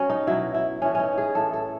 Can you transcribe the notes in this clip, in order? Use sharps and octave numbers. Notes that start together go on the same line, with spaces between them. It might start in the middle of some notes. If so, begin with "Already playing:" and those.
Already playing: F#3 C#4
D#4
B2 F#3 E4
E4
A2 E3 C#4
C#4 D#4
G#4
A2 E3 A4
A4